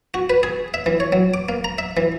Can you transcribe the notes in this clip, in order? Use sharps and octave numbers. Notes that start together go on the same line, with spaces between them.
F#4
B4
G#4
E5
E3
C#5
F#3
D6
A#3
A#5
E5
E3